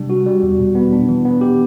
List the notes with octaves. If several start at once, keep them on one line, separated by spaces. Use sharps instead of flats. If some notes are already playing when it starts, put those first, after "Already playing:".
Already playing: C3 G3 D4
F#4
G3
E2
B2
B3
D4
E3
B3
G4